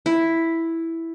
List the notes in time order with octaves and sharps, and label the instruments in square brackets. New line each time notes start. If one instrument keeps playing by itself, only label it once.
[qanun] E4